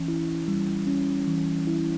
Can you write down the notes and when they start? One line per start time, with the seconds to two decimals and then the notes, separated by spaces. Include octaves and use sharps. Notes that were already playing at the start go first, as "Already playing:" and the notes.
Already playing: E3 C#4
0.08 E4
0.48 G3
0.87 C#4
1.27 E3
1.67 E4